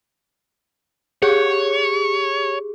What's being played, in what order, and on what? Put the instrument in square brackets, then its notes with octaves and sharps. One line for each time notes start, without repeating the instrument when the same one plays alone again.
[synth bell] G4 G#4 [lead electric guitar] C#5